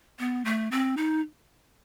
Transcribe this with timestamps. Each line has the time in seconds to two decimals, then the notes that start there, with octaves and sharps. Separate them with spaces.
0.19 B3
0.45 A3
0.71 C4
0.97 D#4